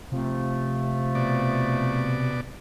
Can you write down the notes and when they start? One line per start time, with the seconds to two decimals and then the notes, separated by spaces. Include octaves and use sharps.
0.12 C3 F3 A3
1.15 B2 D5